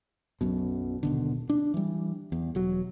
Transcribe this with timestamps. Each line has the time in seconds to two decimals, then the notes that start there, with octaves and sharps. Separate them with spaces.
0.41 B1 F#2 B2
1.03 D#1 B2 D3
1.50 D4
1.74 E3 G3
2.32 E2
2.55 E1 F#3